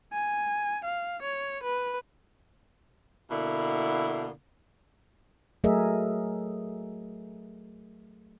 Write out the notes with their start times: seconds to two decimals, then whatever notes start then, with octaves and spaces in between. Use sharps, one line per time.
0.13 G#5
0.85 F5
1.23 C#5
1.64 B4
3.30 B2 D3 A#3 E4
5.64 F#3 A3 G#4 A#4 D#5 E5